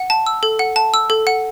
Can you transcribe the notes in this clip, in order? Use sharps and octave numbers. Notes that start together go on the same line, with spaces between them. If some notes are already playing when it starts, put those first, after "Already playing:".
Already playing: F#5
A5
E6
A4
F#5
A5
E6
A4
F#5